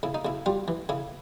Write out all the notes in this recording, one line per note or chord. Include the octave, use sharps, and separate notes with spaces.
C#3 E4
D#4
C#3 E4
G3 F4
E3
C#3 E4